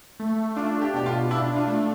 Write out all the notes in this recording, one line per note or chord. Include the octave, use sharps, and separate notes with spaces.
A3
D4 F4
G4
B2 G4
F4
D4 E4
F4
A3